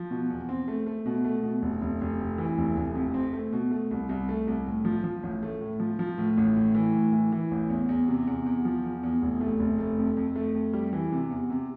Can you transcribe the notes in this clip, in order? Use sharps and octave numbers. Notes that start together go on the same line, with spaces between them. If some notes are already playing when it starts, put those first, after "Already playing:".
Already playing: F3
B2
E2
C4
A3
A3
B2
A3
B2
F1
F1
F1
F2
E3
F1
F1
F2
C4
A3
B2
A3
C2
C2
A3
C2
A2
F3
F3
A1
A3
A2
F3
F3
A2
A1
A2
E3
A2
E3
E3
A1
E2
E2
C3
E2
E2
F3
E2
E2
F1
A3
F1
A3
F2
F2
A3
F2
G3
E3
C3
E2
C3